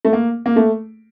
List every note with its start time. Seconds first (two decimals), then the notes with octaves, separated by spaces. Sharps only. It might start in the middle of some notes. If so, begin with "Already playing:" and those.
0.05 A3
0.13 A#3
0.46 A#3
0.56 A3